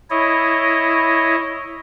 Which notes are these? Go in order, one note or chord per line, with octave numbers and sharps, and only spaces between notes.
E4 C#5 D#5